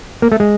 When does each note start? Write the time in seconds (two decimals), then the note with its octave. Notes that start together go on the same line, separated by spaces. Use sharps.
0.22 A#3
0.32 A3
0.40 G#3